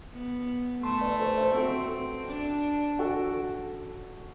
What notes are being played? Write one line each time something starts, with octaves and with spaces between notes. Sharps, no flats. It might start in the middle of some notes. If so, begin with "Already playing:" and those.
B3
A3 A5 C6
B4 D5
A4 C5
C5 E5
C4 F#4 A4
D4
F#4 A4